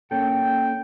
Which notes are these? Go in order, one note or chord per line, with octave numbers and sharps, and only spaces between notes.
A#3 C#4 A4 G5